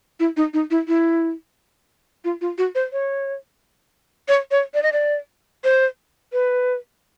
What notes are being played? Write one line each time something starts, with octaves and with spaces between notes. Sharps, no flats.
E4
D#4
D#4
E4
E4
F4
F4
F#4
C5
C#5
C#5
C#5
D5
D#5
D5
C5
B4